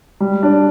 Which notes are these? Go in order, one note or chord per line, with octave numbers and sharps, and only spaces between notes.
G3
D4